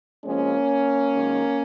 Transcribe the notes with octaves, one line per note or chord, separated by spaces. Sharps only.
C3 F3 G#3 A#3 C#4
F#2 D#3 G#3